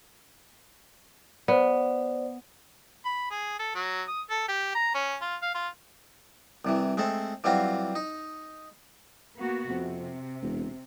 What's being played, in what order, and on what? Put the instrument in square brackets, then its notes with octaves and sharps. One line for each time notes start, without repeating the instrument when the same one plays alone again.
[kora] B3 [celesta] C5 D5
[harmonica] B5
G#4
A4
F#3
D#6
A4
G4
A#5
C#4
F4
F5
F4
[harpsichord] C2 C3 E3
G#3 A3 C4 A4
E3 F#3 G3 C4 F4 F#4
D#4
[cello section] A#3 B3 F#4
[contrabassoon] F2 [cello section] C3
[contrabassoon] E1